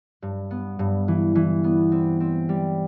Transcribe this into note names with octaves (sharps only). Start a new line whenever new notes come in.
G2
B3
G2
E3
E3
B3
C4
C4
G3